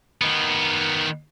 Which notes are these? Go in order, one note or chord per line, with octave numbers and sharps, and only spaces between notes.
D#3 B3